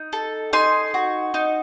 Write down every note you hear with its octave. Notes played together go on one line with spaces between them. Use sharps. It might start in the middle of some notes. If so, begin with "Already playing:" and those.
Already playing: D#4
A4
D#4 G#5 C6
F#4
D#4